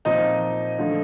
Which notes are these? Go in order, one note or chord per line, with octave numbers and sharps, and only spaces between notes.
A#2 F3 C4 D#4 D#5
D3 F3 A3